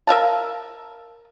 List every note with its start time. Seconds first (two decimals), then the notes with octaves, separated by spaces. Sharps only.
0.07 A#4 E5 F5 A5